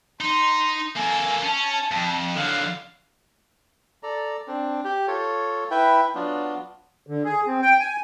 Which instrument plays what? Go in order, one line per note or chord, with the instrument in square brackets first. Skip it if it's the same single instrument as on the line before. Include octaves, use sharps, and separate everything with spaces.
[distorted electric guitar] D#4 [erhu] C6
[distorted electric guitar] A#3 A4 [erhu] G#5
[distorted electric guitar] C#4 [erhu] A5
[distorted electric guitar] F2
[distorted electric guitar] D3 F#3 [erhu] F5
[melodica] A4 D5 A#5
C4 D4
G4
F4 A4 C#5
E4 B4 G5
F#3 B3 D4 F4
[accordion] D3
G#4
C4
G5
G#5